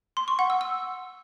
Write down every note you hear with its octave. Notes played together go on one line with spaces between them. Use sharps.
C6
C#6
F#5
E6
E6